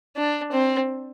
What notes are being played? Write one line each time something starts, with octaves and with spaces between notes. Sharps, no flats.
D4
C4